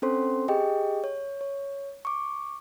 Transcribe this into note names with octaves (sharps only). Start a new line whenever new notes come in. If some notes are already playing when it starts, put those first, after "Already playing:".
C4 C#4 A4 C5 C6
G4 G#4 D#5 G5
C#5
C#5
C#6 D6